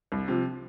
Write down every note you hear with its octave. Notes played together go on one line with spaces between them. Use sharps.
C2
C3 F3